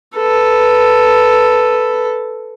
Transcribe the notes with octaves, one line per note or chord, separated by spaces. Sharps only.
A4 B4